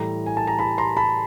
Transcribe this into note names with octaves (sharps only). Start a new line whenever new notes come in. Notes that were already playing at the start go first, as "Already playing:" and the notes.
Already playing: A2 E3 G3 A#5
G#5
A5
A#5
A5 B5
A#5 C6
A5 B5